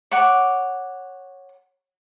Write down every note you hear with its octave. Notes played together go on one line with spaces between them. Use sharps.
C#5 F#5 D6